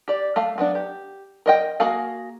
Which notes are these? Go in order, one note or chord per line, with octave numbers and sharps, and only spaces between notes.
G4 D5
A3 F5
F#3 B3 D4
G4
A#4 D#5 G5
A#3 F#4 G#4 F5